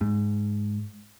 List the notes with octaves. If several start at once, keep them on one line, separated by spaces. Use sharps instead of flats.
G#2